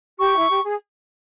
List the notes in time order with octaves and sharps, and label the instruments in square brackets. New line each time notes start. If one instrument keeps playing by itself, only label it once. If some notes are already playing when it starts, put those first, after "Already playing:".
[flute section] G4 [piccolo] C#6
[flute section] E4
G4
G#4